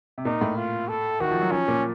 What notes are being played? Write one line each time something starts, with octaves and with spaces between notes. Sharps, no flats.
C3
A#2 D#4
A2
F4
A4
D#3 F#4
F3
F#3
F3 C#4
A#2